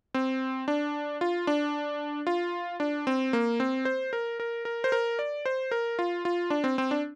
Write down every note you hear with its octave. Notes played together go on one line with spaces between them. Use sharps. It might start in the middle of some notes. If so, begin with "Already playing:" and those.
C4
D4
F4
D4
F4
D4
C4
A#3
C4
C5
A#4
A#4
A#4
C5
A#4
D5
C5
A#4
F4
F4
D4
C4
C4
D4